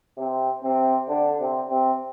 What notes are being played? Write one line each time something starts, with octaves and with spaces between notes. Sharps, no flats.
C3 C4
C3 C4
D3 D4
C3 C4
C3 C4